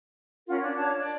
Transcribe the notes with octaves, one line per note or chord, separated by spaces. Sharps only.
C#4 F4 A#4 F#5
D4 G#6
D4 C#5 A5 G#6
D5